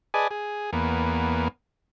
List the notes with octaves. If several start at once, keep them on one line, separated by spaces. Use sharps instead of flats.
G#4 B4 D5 D#5 G#5 A5
G#4
E2 A#3 B3